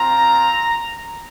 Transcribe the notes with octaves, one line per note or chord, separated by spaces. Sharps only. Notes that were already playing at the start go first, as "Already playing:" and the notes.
Already playing: C4 F4 A#5